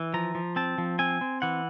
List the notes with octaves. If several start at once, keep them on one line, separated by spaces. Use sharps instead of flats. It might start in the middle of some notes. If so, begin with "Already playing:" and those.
Already playing: E3
F3 A#5
F3
C4 A5
F3
C4 G#5
C4
E3 F#5